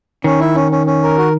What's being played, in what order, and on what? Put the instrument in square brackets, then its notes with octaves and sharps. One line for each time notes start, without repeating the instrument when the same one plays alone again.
[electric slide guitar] D#3 [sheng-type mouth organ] C#4
[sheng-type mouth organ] E4
C#4
C#4
C#4
A#4
F#4